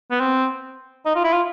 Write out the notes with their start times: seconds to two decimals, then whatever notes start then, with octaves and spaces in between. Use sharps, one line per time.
0.11 B3
0.20 C4
1.06 D#4
1.16 F4
1.24 E4
1.33 F4